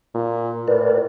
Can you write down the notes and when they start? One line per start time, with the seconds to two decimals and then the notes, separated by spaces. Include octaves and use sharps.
0.15 A#2
0.67 A2 A#4 B4 D5